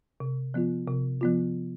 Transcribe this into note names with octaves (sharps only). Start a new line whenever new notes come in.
C3
F3 B3 F4
C3
F3 B3 F4